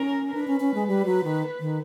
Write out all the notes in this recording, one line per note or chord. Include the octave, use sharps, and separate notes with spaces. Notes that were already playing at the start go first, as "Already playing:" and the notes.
Already playing: C#4 A#4
D4 B4
C#4
C#4
G#3
G3
F#3
D#3
D#3